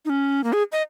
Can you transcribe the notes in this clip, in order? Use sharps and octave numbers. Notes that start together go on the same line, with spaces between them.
D#4
C#4
A#3
G#4
D#5